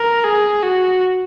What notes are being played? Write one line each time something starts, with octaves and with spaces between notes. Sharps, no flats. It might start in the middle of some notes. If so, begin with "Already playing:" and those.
Already playing: A#4
G#4
F#4